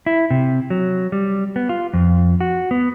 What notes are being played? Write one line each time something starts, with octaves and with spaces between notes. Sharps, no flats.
E4
C3
F#3
G3
B3
F4
F2
F#4
B3